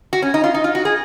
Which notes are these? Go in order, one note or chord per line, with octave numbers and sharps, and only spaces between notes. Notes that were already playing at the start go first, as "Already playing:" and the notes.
F#4
C#4
D#4
F4
D#4
F4
F#4
G#4